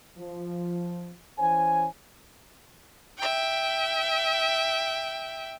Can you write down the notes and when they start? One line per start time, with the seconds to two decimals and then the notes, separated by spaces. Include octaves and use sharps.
0.18 F3
1.38 E3 C#4 C5 G#5
3.18 E5 G5